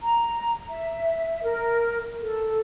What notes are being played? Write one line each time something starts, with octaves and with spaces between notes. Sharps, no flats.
A#5
E5
A#4
A4